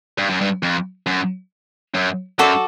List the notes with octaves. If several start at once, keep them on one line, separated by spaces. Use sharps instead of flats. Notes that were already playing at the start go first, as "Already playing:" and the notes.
G2
F#2
G2
F2
F#2
F#2
F#2 F#4 A4 D5